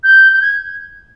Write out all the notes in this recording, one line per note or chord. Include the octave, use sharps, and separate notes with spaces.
G6
G6
G#6